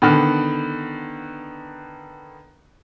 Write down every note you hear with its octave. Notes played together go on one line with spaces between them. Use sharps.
D3 D#3 B3